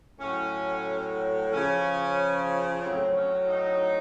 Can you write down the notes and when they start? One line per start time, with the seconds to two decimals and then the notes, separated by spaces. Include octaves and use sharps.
0.19 A2 F#3 C#4
1.51 C#3 F3 C#4
2.83 A2 F#3 C4
3.16 C#4
3.49 D#4